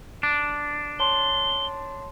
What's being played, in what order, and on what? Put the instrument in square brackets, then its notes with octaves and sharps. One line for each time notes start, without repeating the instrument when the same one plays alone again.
[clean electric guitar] D4
[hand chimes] C#5 A5 C6 [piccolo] G7